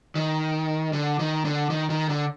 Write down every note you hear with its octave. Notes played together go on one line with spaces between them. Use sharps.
D#3
D3
D#3
D3
D#3
D#3
D3